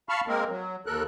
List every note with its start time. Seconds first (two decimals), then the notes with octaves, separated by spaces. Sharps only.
0.09 F5 A5 B5 C#6 F6
0.28 G#3 A#3 C4 A#4
0.49 F#3
0.86 D#2 A4 A#4 F#6